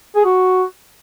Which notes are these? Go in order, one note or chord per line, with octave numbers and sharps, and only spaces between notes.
G#4
F#4